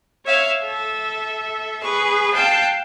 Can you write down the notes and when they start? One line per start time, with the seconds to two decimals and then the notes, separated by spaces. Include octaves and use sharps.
0.26 C#5 E5 F5
0.60 A4 E5
1.83 G#4 B4 C#6
2.35 F5 G5 A5 F#6